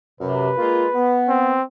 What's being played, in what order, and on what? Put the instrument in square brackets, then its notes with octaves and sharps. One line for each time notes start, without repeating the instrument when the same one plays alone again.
[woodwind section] F#2 C3 [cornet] B4
[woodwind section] G#3 A#3 F4
B3
[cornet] C4